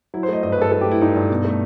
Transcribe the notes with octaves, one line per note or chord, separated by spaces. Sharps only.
F#3 E4
C5
A3 D#5
G2 D#5
B4
G2 A4
F#3 A4
G4
A3
E4
G2 D#4
G2
B2
A3